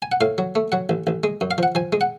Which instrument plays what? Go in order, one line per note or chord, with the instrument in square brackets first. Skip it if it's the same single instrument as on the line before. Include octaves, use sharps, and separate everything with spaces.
[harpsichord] G#5
F#5
A2 F5
F#3
A3
F#3 F#5
A1
A1
G#3
F#2
F5
F3 F#5
F3 G#5
G#3
F#5